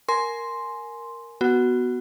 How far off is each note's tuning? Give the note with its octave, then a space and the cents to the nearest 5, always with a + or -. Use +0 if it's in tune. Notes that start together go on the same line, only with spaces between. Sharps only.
A#4 +0 G#5 +15 C6 +0
B3 +0 F#4 +5